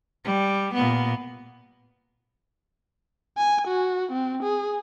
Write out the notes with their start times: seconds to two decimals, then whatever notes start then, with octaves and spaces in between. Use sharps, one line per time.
0.25 G3
0.74 A#2 B3
3.38 G#5
3.68 F#4
4.12 C4
4.43 G#4